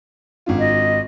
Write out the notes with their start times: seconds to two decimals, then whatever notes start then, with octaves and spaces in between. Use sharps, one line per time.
0.46 G#1 D4 F4
0.59 D#5